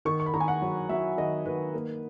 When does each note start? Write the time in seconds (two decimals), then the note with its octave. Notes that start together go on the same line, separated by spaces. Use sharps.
0.05 D#3 C#6
0.20 C#6
0.26 B5
0.34 D#3 A#5
0.40 G#5
0.48 F#5
0.62 F#3
0.89 F#3 E5
1.18 D#3 D#5
1.46 D#3 B4
1.74 A#3